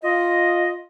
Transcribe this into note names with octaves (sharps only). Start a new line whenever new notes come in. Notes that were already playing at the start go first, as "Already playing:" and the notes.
F4 D#5